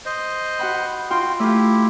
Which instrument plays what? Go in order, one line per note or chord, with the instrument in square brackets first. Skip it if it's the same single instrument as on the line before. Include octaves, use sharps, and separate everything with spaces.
[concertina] C5 D#5
[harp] F#4 F#5 B5
[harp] F4 C6 [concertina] F#4 G5
[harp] A3 F4 [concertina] E4 G4